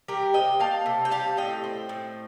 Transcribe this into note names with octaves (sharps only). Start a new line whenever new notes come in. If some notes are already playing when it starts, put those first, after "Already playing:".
G3 G4 A#4
C3 D#5 G5
A#3 F5 A5
C3
G5
G3 F5 A5
A2 D#5 G5
C4
A2